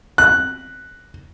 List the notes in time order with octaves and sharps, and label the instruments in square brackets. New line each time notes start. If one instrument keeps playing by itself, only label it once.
[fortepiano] F#6